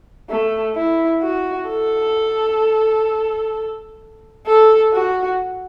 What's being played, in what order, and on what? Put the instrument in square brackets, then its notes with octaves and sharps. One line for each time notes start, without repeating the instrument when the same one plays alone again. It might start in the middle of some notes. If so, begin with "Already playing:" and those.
[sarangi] A3
E4
F#4
A4
A4
F#4